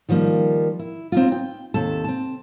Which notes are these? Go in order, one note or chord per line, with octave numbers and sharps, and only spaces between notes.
D#3 F3 G3 A#3
E4
C4 D#4 F4
G5
D#2 C3 A4 A5
C4 A5